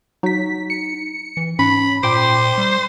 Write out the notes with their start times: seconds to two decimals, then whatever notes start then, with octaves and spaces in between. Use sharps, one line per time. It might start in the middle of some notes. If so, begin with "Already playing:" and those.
0.23 F#3 D#4 B6
0.70 C#7
1.37 E3
1.59 G#2 C#4 B5
2.03 A#2 C5 G5 D6
2.58 G3